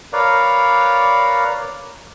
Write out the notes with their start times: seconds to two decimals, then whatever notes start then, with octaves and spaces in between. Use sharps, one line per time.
0.13 A#4 B4 C#5 D5 F5